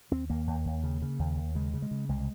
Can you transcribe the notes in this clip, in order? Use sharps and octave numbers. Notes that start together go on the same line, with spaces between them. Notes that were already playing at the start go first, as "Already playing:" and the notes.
D#2 C4
D#2 A#3
D#2
D#2
C#3
C#3
D#2
D#2
C#3 G#3
C#3
G#3
C#3
C2 G#3